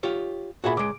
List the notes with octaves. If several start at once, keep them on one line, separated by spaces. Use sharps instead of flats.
F4 G4 C#5
A#2 F#4 G#4 E5 F#5 B5
C#2 G#3 D6 D7